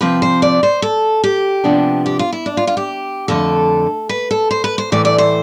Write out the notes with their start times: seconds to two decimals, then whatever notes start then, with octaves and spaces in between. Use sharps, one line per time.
0.01 C3 F3 C4 B4
0.22 C5
0.42 D5
0.63 C5
0.82 A4
1.24 G4
1.64 C3 F3 B3 D4
2.06 G4
2.19 F4
2.33 E4
2.46 D4
2.57 F4
2.67 F4
2.77 G4
3.28 F2 D3 A3 A4
4.09 B4
4.31 A4
4.51 C5
4.64 B4
4.78 C5
4.92 A2 E3 A3 D5
5.05 D5
5.18 C5